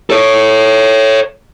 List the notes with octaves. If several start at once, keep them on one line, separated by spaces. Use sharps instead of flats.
A4 C#5